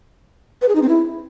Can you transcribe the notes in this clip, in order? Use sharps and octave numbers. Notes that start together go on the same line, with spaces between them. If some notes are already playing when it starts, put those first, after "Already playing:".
B4
G#4
D#4
C4
E4